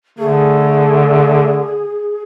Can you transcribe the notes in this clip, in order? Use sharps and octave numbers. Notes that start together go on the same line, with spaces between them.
D3 A3 G#4